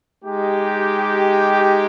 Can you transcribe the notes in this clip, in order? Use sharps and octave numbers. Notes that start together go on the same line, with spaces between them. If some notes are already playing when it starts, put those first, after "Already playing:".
G#3 D#4 G4